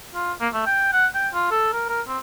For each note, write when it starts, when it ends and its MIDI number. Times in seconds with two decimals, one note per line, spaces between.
0.15 0.33 65
0.41 0.49 58
0.54 0.64 57
0.66 0.88 79
0.93 1.06 78
1.15 1.29 79
1.34 1.47 65
1.51 1.72 69
1.73 1.89 70
1.89 2.02 70
2.08 2.18 60